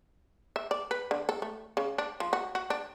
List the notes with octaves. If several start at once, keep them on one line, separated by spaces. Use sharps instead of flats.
E5
D5
B4
D3
A4
A3
C#3
D4
F3
F#4
F#4
D4